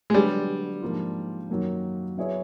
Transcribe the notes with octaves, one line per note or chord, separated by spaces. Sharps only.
G#3
D3 F#3 G3 B3 D4 G4
G#2 F3 A#3 D4 F4
F#2 D#3 F#3 A#3 C#4
F#3 B3 E4 G#4 C#5